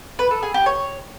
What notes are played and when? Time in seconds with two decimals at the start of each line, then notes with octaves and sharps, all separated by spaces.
0.19 B4
0.31 A4
0.43 G#4
0.54 G4
0.66 C#5